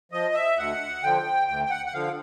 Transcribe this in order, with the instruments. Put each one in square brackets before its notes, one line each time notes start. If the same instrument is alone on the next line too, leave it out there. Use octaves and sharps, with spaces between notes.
[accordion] F3 D#5
E5
D2 F#5
D3 F3 G5
D2 G5
G5
F#5
F#5
D3 F3 F5